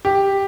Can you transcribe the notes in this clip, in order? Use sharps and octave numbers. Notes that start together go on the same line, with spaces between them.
G4